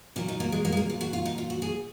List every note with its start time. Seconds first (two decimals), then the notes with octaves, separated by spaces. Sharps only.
0.16 A#2 F#3 A#3
0.28 D#4
0.40 A#3
0.52 G#3
0.65 A#3
0.72 G#3
0.77 A#3
0.89 F4
1.01 F#4
1.13 F4
1.25 D#4
1.38 F4
1.50 F#4
1.62 G#4